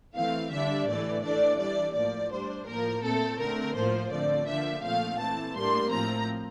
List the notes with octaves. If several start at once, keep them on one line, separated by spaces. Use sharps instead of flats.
E3 A3 C4 F5
D3 G3 D4 E5
A2 E3 A3 D5
E3 A3 D4 D5
E3 G3 D4 D5
A2 F3 A#3 D5
A2 G3 D4 C5
A2 F3 A#3 A#4
A#2 A3 C4 A4
D3 A3 C4 A#4
A2 F3 A#3 C5
D3 F3 A3 C4 D5
D3 F3 A#3 D4 E5
A#2 F3 A3 C4 F5
E3 A3 C4 A5
A2 G3 A#3 D4 C6
A2 F3 C4 A#5